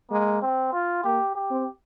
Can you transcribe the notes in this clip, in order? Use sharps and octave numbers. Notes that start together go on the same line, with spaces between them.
G#3 A#3
C4
F4
A#3 G4
G4
C4